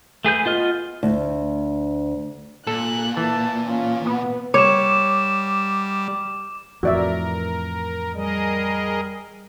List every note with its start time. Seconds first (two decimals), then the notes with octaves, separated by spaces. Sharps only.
0.25 A3 G#4 B4 G6
0.45 B3 F4 D#5 F6
1.03 D2
2.67 A#2 A4 F#6
3.17 E3 A5
3.66 C#4 F4
4.06 B3 B4
4.54 G3 C#5 D6 E7
6.83 F2 A2 E3 F#4 A#4 D5 E5
8.14 G3 G#4 A#4 D#5